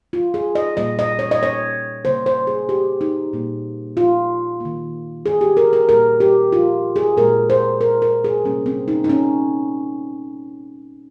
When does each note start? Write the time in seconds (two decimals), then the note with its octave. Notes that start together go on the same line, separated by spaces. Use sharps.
0.13 F4
0.34 G#4
0.55 D#5
0.77 A#2 G3 A#3 D#5
0.99 D#5
1.19 C#5
1.31 D#5
1.43 C#5
2.05 C#3 G3 A#3 C5
2.26 C5
2.47 G#4
2.69 G4
3.01 D#4
3.33 A#2 G3 A#3
3.97 F4
4.60 D#3 A#3
5.26 G#4
5.41 G4
5.57 A#4
5.73 A#4
5.89 A#2 G3 A#3 A#4
6.20 G4
6.52 F4
6.96 G#4
7.17 A#2 G#3 A#4
7.50 C5
7.81 A#4
8.02 A#4
8.24 G#4
8.45 C3 G3 A#3 C#4
8.66 C4
8.88 D#4
9.04 D#4
9.09 C#4